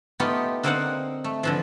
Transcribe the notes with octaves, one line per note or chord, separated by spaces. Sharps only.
A3 B3 D#4 F4 G4
D3 A#3 C4 D#4 F5 F#5
A3
D3 E3 F3